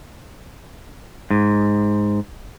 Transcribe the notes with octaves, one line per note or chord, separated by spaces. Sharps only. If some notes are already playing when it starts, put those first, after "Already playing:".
G#2